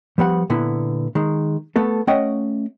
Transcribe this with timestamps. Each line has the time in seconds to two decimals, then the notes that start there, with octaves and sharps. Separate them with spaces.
0.18 F3 G3 B3 F#5
0.50 A#2 D3 B3 E4
1.15 D#3 G#3
1.76 A3 B3 A4
2.07 A3 C#4 D#5 F#5 G5